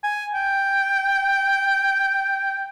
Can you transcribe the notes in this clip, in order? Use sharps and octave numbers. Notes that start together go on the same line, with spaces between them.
G#5
G5